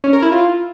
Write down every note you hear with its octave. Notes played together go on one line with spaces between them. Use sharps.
C#4
A#4
E4
F4